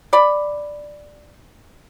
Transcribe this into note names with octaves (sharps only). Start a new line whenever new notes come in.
D5 B5